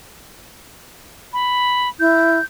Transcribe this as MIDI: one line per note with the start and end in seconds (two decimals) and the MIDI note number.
1.33 1.89 83
2.00 2.38 64
2.00 2.45 91